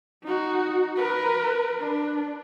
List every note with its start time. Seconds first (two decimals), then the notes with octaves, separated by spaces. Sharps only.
0.23 D#4 F#4
0.96 A#4 B4
1.80 D4